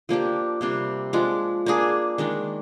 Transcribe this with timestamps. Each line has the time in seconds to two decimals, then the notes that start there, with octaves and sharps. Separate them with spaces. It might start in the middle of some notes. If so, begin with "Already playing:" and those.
0.09 F3 A#3 D4 G4
0.61 C3 G3 A#3 D4
1.13 F3 G#3 D4
1.66 A#3 D4 G#4
2.18 D#3 G#3 D4